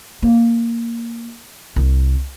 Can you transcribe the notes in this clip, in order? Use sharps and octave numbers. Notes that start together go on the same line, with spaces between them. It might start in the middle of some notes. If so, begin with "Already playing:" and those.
A#3
C2